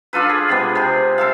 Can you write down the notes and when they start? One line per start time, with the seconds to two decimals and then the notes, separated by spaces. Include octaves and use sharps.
0.13 D4 F4 A4 B4
0.30 G#4
0.49 C3 G#3 B3
0.75 C3 G#4
1.18 A4 E5 F5